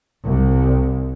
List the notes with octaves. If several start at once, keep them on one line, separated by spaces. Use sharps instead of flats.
C2